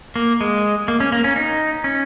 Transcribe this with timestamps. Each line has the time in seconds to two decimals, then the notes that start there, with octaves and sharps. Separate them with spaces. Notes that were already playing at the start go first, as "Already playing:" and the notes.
0.16 A#3
0.41 G#3
0.88 A#3
1.00 C#4
1.12 A#3
1.24 C#4
1.36 D#4
1.84 C#4